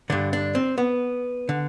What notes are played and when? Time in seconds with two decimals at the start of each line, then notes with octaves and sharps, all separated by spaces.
0.10 G2 D3 D4
0.33 D4
0.55 C4
0.78 B3
1.49 D3